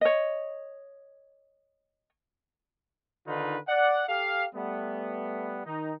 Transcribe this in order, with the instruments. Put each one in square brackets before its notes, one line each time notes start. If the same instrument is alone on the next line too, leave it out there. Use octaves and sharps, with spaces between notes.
[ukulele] C#5 D#5
[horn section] D3 D#3 D#4 F4 B4
D5 F#5
G4 A4 F5
G3 A3 B3
D#3 D#4